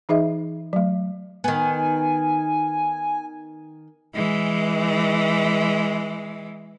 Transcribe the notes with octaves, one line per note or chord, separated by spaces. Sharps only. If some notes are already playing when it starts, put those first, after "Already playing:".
E3 D#4 G#4 D#5 E5
F#3 A3
D#3 B3 G#5
E3 G#3